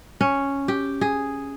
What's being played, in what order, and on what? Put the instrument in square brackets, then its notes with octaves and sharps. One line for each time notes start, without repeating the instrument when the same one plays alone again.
[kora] C#4
G4
G#4